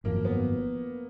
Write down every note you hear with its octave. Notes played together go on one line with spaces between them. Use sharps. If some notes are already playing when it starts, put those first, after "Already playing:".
G#1 F#2 F3 A#3
B3